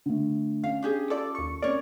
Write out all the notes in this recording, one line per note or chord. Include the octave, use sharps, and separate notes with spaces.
D3 A3
C#4 F5
D4 G4 G#4
F4 A4 D5
D#2 C#6
C4 C#4 A#4 C#5 D5